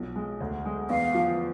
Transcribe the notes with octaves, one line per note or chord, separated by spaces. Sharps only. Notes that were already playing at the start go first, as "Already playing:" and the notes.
Already playing: B1 F3
G#3
D2
G#3
E2 F5
F3